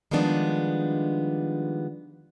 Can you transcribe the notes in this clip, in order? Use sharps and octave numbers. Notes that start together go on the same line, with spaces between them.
D#3 F3 G3 G#3 B3 D4